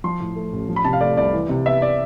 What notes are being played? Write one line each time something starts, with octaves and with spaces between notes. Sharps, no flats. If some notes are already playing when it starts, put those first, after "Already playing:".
F3 C6
A2
A3
A1
F3
B5
C3 A5
F5
A3 D5
C2 D5
E3
C3
B3 E5
D5